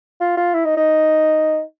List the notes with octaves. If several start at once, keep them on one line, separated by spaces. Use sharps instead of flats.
F4
F4
E4
D#4
D#4